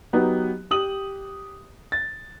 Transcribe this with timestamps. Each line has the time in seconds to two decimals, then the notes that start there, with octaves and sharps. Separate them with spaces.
0.13 F#3 B3 D#4 G4
0.71 G4 D#6 F#7
1.92 A6